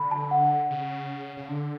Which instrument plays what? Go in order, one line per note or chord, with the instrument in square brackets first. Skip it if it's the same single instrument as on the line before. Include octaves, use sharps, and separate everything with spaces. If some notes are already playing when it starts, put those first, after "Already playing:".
Already playing: [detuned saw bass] D3 [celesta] B5
[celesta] A5
F#5
[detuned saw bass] C#3
C#3
D3